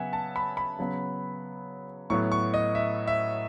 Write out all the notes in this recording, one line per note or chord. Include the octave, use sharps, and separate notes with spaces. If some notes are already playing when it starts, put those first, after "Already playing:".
Already playing: C#3 F#3 B3 E5 F#5 G#5
A5
B5
B5
C#3 F#3 B3
A2 F#3 B3 C#6
C#6
D#5
E5
E5